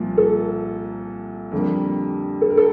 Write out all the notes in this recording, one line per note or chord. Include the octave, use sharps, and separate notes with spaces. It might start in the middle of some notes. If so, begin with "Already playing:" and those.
Already playing: C2 A#2 F3
A4
F2 D3 G3 A#3
A4
A#4
A4